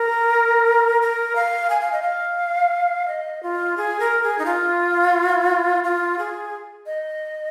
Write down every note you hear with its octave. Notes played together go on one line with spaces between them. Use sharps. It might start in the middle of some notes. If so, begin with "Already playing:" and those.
Already playing: A#4
A#4
F5
G#5
F5
D#5
F5
D#5
F4
G#4
A#4
G#4
D#4
F4
F4
G#4
D#5